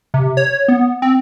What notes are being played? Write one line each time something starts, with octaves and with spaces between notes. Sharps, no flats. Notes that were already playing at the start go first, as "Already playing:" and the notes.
C3
C#5
B3
C4